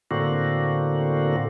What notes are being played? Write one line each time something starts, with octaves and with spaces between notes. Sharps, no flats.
A2 D3 A#3 C4 F#4